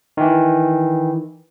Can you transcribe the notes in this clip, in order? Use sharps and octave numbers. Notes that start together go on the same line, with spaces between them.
D#3 E3